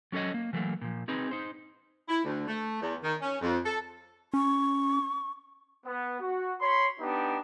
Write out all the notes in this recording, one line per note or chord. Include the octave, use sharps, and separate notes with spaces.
F#3 C#4 A4 C#5 D#5
A#3
E3 F#3 A3 A#3
A#2 F3
C4 D#4 G#4 B4
D#4 C5
E4
D2
A3
E2
D#3
C#4
F2
A4
C#4 C#6
B3
F#4
C#5 B5 C6
B3 D4 D#4 G4